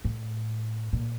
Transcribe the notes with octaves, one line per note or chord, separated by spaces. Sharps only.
A2
A#2